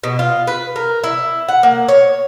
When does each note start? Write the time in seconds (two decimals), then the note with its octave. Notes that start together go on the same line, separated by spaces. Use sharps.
0.04 B2
0.19 F4
0.47 B4
0.76 A#4
1.04 E4
1.48 F#5
1.63 A#3
1.89 C#5